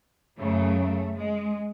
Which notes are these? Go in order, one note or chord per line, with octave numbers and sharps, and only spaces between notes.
F#2 C#3 F#3 A3
G#3